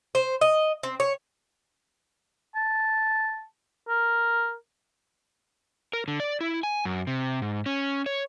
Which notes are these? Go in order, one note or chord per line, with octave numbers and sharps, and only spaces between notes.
C5
D#5
C4
C#5
A5
A#4
A#4
D3
D5
E4
G#5
F#2
C3
G#2
C#4
C#5